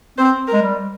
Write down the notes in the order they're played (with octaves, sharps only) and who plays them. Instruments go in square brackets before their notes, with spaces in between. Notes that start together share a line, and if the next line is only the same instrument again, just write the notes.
[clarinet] C4 [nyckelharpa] C5
[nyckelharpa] A#4
[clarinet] G#3
G3